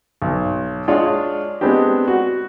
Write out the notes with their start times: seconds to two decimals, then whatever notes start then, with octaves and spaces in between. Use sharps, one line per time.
0.22 B1
0.88 G#3 D4 F4 C#5 D5 F5
1.61 G#3 B3 C4 D4 G4
2.07 F#4